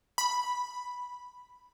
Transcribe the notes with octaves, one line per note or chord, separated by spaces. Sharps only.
B5